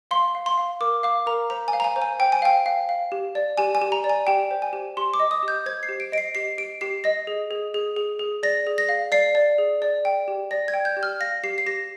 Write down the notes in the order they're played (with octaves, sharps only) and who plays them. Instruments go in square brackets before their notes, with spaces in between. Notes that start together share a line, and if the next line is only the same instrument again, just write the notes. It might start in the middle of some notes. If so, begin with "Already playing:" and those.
[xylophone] F5 C6
F5
C6
F5
A#4 D6
F5 D6
A#4 A#5
C5 A#5
G#5
F5
A#5
G#5
C5
G#5
C5 G5
G#5
F5 G5
F5
F5
G4
D5
G4 G#5
G#5
G4
A#5
D5
G#5
G4 G5
C5
G#5
G4
G4 C6
D6
D#5
D#6
G4
G6
C5 G#6
C7
G4
D7
D#5 D7
C7
G4 C7
G4 D7
G4 C7
D#5 A#6
G#4
G#4
G#4
G#4
G#4
D5 A#6
G#4
A#6
F5
D5 C7
D5
G#4
D5
G5
G4
D5 A#6
G#6
G5
G6
G4
F6
F5 A#6
G4 C7
C7
G4 A#6